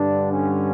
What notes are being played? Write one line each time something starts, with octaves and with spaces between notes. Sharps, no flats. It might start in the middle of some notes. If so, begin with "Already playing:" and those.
Already playing: G2 D3 D4
C#4